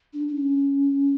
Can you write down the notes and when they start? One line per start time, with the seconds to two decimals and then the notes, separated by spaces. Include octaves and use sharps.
0.13 D4
0.28 D4
0.35 C#4